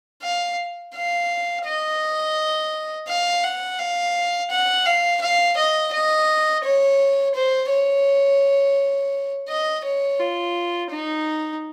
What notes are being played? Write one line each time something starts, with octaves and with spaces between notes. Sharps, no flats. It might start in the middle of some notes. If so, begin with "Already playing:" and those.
F5
F5
D#5
F5
F#5
F5
F#5
F5
F5
D#5
D#5
C#5
C5
C#5
D#5
C#5
F4
D#4